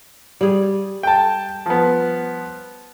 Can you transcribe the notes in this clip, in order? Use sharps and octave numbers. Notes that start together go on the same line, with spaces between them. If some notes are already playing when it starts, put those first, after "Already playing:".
G3 G#4
G5 A5
F3 B3